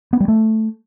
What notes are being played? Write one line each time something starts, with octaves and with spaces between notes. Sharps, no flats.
B3
G3
A3